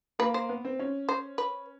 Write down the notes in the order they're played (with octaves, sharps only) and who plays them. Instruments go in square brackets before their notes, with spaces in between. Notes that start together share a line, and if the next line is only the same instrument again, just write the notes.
[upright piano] A#3 [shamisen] B4
[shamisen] C5
[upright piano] B3
C4
C#4
[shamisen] C5
B4